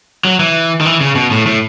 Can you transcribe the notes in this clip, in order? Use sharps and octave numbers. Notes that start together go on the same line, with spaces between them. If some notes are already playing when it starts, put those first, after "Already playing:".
F#3
E3
D#3
E3
C#3
B2
A2
A2